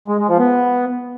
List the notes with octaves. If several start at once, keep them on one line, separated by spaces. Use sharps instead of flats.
G#3
G#3
F3
B3